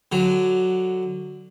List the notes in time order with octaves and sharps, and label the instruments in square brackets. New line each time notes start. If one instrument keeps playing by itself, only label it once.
[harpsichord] D3 F#3